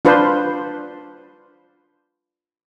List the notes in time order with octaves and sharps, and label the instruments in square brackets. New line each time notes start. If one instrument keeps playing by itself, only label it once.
[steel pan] D4 F4 B4 C5